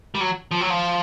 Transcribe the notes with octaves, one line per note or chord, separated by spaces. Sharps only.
G3
F#3
F3
F#3
F3